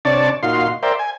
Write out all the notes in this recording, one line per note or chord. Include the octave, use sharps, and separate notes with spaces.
C3 D4 C#5 D5 A5
A#2 D#4 F#4 F5 C6
A#4 C5 D5 E5 G5
G#5